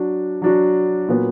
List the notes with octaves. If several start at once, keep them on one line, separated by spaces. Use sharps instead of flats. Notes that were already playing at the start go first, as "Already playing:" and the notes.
Already playing: F#3 D4 F#4
F#3 D4 F#4
A#2 F#3 B3